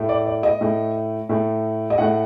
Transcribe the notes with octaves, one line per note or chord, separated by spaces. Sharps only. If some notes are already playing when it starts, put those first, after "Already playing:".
Already playing: A2 A3
D5
D5
D#5
A2 A3
A2 A3
D#5
A2 A3 F#5